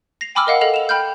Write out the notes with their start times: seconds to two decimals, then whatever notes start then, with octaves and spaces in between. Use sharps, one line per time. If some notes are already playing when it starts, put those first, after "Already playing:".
0.21 A#6 C7 F7
0.35 G5 G#5 B5 D6 E6 F6
0.47 A#4 D#5 F5 F#5
0.61 A4 D#5 F5 F7
0.74 E7 F7
0.89 G5 B5 F6 G6